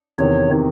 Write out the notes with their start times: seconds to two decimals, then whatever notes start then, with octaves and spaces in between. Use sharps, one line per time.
0.18 E2 C3 D#3 C#5
0.49 C3 D#3